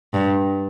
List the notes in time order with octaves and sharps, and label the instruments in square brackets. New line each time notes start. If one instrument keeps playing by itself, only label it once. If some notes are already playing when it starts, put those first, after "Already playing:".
[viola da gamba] G2